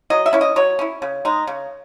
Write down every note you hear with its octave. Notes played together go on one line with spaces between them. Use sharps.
F#3 D#5
E5
C#4 E4
D#5
F#3 C#5
C#4 E4
C#3
G#3 D#4
C#3